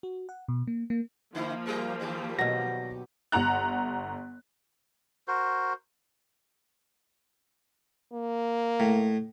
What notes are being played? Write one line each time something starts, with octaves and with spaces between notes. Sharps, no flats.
F#4
F#5
B2
A#3
A#3
D3 F3 A#3 D#4 E4
F#3 G#4 A#4
G2 D#3 G3
B2 F#3 A#6
G1 F#5 A#5 F#6
F#4 A#4 C5
A#3
A2